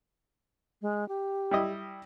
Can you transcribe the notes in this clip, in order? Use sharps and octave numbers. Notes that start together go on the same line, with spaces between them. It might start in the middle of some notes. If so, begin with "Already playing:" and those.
G#3
G4
G3 E4 D#5